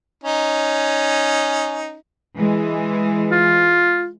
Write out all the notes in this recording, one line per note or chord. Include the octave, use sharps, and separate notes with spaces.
C#4 D#4
E3 G#3
F4